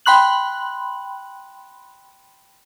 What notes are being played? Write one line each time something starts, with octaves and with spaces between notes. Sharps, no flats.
G5 B5 C6 F#6 F#7